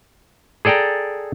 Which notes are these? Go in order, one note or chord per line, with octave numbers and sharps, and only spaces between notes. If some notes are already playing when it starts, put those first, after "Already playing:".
G#4 A4 D5 G5 A#5